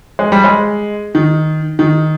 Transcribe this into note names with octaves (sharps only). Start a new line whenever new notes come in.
G#3
G3
G#3
D#3
D#3